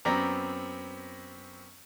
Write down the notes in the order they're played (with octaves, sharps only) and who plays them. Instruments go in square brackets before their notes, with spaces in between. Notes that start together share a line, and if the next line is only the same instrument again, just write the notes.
[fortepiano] F#2 B3 C4 D5 A#5